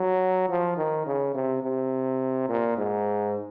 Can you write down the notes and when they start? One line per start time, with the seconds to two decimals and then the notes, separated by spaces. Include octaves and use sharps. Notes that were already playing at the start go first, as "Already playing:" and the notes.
Already playing: F#3
0.49 F3
0.77 D#3
1.06 C#3
1.34 C3
1.63 C3
2.49 A#2
2.77 G#2